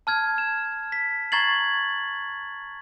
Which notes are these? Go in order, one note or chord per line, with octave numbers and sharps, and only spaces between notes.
A5 F6 G#6
E7
B6
A#5 C#6 G#6 A6 C7 F#7